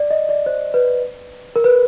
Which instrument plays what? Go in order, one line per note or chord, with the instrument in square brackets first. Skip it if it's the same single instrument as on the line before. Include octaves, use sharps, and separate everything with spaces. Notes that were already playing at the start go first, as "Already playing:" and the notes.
Already playing: [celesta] D5
D#5
D5
C5
B4
A#4
B4